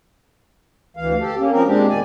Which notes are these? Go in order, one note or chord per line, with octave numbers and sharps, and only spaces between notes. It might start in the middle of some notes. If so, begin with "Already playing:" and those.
D2 E3 F5
G4 A4
A#3 C#4
F3 C4 C#4 A#4
A#2 G#3 C4 D4 G4
E2 D#3 D5 G#5